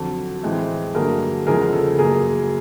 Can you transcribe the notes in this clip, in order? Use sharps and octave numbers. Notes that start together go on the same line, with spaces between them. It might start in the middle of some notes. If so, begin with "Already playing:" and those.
Already playing: F2 D3 F#3
A2 E3 G#3 C4
G2 D3 F#3 A#3 G#4 A#4
E2 C#3 F3 G#3 G#4 A#4
A4
F#2 C#3 F#3 A#3 G#4 A#4